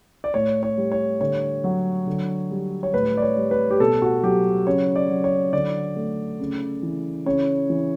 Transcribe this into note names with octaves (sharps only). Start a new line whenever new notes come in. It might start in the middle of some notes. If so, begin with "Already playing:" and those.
D5
A2 C#5
C#5
G3
C#5
D3 C#5
F#3
D3
G3
C#5
A2 B4
D5
C#5
G3
B4
G4
B2 A4
F#4
F#3 G4
C#3 C#5
D5
F#3
C#5
D3 D5
A3
C#3
E3
C#3 C#5
E3